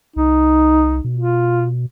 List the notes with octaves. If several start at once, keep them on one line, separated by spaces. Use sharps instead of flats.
C2 D#4
B2
F4